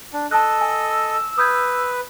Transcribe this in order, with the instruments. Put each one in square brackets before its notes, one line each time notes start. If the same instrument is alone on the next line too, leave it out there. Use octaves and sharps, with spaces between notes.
[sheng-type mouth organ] D4
[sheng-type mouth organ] A4 D#5 [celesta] A5 F#6 [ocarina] E6
[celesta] G#5
[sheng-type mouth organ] B4 [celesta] D#6 G6 G#6